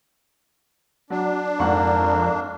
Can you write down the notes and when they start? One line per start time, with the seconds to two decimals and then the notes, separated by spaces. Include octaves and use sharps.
1.10 F#3 D4
1.60 F2 G#2 A#3 F#5 C#6